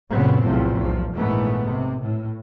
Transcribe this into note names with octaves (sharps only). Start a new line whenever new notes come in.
F#1 F#2 A#2 C#3 B3 C4
B1 E2 A2 C3 F3
B1 F3
A#1 D#2 G#2 E3 A3 B3
C3
A2